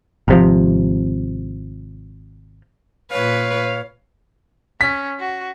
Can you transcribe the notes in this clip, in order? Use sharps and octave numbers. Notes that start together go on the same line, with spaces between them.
G#1 C3 F3
A#2 B4 C#5 F5
C#4 B6
F#4